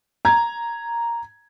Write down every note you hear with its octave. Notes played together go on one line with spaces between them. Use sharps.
A#5 G#6